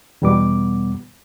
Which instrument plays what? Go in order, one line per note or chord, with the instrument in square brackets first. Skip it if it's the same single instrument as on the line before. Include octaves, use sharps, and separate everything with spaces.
[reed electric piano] E2 B2 G3 B3 D6